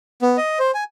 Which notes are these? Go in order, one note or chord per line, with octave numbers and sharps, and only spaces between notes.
B3
D#5
C5
G#5